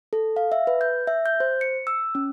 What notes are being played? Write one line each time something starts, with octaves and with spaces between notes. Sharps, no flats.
A4
F5
E5
B4
G6
E5
G6
C5
C#7
E6
C#4